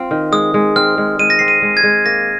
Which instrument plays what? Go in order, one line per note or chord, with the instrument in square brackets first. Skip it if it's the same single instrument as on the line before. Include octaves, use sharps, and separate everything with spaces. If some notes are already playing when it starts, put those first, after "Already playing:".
Already playing: [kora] C4 F4
D#3
[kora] G#3 [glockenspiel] D#6
[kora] G#3
[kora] C4 [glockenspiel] F6
[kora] G#3
[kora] G#3 [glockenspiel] D#7
[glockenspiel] A#6
[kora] C4 [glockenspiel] C7
[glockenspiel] D#7
[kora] G#3
[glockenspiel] G#6
[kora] G#3
[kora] A#3 [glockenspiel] A#6